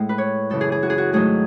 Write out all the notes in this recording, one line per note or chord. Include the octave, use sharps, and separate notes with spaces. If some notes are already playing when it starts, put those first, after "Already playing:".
Already playing: A2 G#3
B4
C#5
F#2 C#3 E3 A4
G#4
G#4
F#4
G#4
F#4
G#2 D#3 F#3 A3 G#4